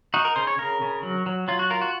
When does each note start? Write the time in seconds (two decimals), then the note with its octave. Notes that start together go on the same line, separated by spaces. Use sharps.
0.14 D#4 F#4
0.25 A#4
0.36 C#3 C5
0.47 C#5
0.59 C#3 A#4
0.82 C#3
1.03 F#3
1.26 F#3
1.48 F#3 F4
1.59 F#4
1.70 F4 A#4
1.81 F#4